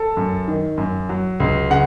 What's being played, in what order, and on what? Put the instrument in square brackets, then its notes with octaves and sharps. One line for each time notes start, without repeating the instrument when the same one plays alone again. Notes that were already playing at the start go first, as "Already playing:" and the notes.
Already playing: [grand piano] A4
F#2
D#3
F#2
F#3
C#2
C#3 F#5